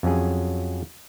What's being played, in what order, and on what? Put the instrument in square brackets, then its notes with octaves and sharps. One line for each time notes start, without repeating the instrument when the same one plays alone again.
[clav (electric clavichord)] F2 F#3 C#4 G#4